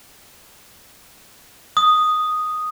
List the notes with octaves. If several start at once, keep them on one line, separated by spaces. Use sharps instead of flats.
D#6